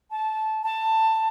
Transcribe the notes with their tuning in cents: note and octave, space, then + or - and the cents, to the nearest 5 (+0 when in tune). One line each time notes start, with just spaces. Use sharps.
A5 -15
A5 +15